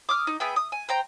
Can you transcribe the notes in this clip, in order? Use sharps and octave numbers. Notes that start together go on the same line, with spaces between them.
D6 D#6 F6
D#4
B3 G#4 E5 G5
D#6
G#5
C5 G5 A#5